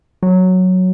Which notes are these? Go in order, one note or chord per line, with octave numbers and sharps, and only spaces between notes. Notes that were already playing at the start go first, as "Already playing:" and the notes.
F#3